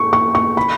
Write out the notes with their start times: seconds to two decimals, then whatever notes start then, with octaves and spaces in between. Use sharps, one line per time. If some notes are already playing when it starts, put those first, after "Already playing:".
Already playing: C#6
0.13 C#6
0.35 C#6
0.57 B5